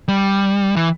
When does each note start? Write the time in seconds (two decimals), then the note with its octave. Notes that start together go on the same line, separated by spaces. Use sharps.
0.08 G3
0.76 E3